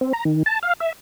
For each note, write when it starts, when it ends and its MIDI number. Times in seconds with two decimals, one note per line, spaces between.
0.01 0.13 60
0.13 0.24 82
0.25 0.43 51
0.46 0.59 81
0.63 0.73 77
0.80 0.92 76